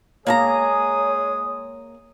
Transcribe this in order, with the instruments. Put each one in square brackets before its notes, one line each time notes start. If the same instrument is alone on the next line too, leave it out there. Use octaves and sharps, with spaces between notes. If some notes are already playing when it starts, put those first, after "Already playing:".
[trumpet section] G#3 G#4 D#6 [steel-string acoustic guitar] A#3 A5 A#5 [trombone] C#5